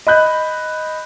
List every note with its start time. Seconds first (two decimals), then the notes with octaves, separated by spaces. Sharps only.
0.07 D#5 B5 F#6 G6